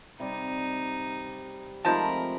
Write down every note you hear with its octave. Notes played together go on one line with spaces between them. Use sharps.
C3 G3 D#4 D5
F3 G#3 A3 C4 D#4 A#4 A5 B5